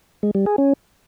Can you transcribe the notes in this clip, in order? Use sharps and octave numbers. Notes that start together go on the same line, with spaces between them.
G#3
G3
G#4
C#4